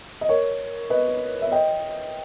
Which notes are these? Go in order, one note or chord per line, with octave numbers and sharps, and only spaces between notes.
D#5
A#4 C#5
B4 D#5
E5
D#5 G5